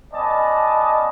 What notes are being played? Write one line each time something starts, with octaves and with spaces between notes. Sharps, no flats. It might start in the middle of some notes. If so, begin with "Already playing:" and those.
B3 C#4 D5 D#5 A5